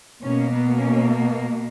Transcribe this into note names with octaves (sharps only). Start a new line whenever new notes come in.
B2 A#3 C#4
B3
C#4
B3